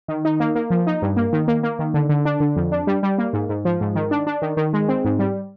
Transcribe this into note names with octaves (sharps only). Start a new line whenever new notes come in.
D#3
D#4
A#3
A#3
F3
D#4
G2
A#3
D#3
A#3
A#3
D#3
D3
D3
D4
D3
F2
D4
G3
G3
A#3
G#2
G#2
F3
G#2
D#3
D4
D4
D#3
D#3
G#3
C4
G#2
G3